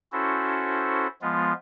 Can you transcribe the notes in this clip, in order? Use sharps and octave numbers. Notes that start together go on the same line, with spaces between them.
C#4 E4 F#4 A4 C5
F3 G#3 B3 F4